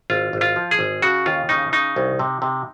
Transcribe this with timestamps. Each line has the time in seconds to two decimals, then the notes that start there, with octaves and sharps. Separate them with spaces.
0.10 G#1 F4
0.33 G#1
0.41 F4
0.56 F3
0.71 G#4
0.79 G#1
1.02 C#3 F#4
1.26 D#2 F4
1.49 C#3 D#4
1.73 C#3 D#4
1.96 C2
2.19 C3
2.42 C3